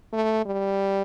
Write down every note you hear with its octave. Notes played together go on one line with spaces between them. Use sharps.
A3
G3